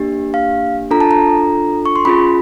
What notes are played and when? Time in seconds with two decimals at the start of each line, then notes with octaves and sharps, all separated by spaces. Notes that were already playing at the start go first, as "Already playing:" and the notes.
Already playing: A#3 D4 G4
0.34 F5
0.91 D4 F4 A4 A#5
1.01 A5
1.11 A#5
1.86 C#6
1.96 C6
2.05 C#4 F4 G#4 B5